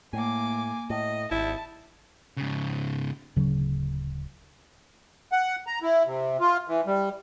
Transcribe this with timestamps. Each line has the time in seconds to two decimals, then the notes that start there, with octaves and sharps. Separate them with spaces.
0.13 A2 A#3 G#5 D6
0.90 A2 D#5
1.31 G#1 E4 A5
2.37 G#2 C#3
3.36 D1 C#3 F#3
5.32 F#5
5.67 A#5
5.82 E4
6.06 C3
6.40 F4
6.68 E3
6.87 G3